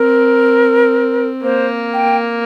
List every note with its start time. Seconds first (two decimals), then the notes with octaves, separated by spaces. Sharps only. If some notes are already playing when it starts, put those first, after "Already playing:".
Already playing: C4 A#4
1.43 A#3 C5
1.93 G5